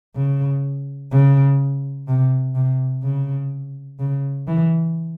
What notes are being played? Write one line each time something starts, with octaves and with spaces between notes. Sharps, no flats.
C#3
C#3
C3
C3
C#3
C#3
E3